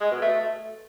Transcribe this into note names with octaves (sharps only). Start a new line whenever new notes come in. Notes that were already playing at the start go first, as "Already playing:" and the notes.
G#3
B2
A3